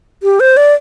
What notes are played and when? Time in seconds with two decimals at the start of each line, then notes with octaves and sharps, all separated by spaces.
0.23 G4
0.40 C5
0.57 D5